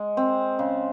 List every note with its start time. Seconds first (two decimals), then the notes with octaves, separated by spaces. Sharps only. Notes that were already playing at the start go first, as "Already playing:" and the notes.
Already playing: G#3
0.17 C4
0.59 C#3